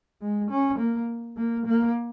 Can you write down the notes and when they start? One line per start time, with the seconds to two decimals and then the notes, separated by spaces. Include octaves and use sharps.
0.22 G#3
0.51 C#4
0.79 A#3
1.37 A#3
1.66 A#3